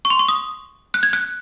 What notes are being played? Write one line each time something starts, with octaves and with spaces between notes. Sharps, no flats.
C#6
C6
C#6
D#6
F#6
G#6
F#6